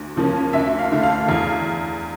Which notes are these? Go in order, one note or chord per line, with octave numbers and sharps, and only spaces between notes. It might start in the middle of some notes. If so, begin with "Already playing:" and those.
Already playing: D2
C#3 F3 A#3 C#4
D2 E5
F5
D3 A3
F5
E2 F5